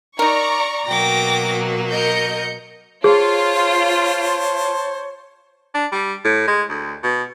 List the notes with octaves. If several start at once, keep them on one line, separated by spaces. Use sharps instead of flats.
D#4 A#4 D5 A#5 C#6
B2 F#3 A#3 G5 D6 A#6
A#4 D#5 G6 C#7
F4 G#4 C5 C#5 A5
D4
G3
A2
G#3
D2
B2